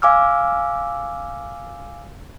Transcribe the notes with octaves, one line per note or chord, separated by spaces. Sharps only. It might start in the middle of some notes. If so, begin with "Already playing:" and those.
F5 G#5 D6 E6 F6